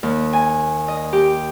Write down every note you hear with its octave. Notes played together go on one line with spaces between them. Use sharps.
D#2
G#5
D#5
G4